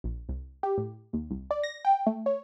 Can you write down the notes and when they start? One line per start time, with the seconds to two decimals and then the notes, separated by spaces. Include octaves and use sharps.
0.04 A#1
0.29 C2
0.63 G4
0.78 A2
1.13 D#2
1.30 C2
1.51 D5
1.63 A#6
1.85 G5
2.07 A3
2.26 C#5